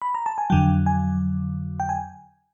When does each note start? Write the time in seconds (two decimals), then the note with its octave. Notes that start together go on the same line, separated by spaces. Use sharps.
0.02 B5
0.15 A#5
0.26 A5
0.38 G#5
0.50 F2 D3 F#3 G5
0.86 G#5
1.80 G5
1.89 G#5